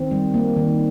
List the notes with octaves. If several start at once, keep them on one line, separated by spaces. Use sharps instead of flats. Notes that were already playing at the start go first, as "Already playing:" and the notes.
Already playing: D#3 C4
G3
A#3
D#3